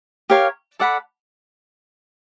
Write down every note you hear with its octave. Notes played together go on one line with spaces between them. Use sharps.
G4 A#4 C#5 F5
A4 D5 F#5 B5